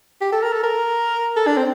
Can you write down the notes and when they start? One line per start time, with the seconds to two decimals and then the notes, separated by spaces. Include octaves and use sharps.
0.21 G4
0.32 A4
0.43 A#4
0.53 A4
0.64 A#4
1.37 A4
1.47 D4
1.57 C4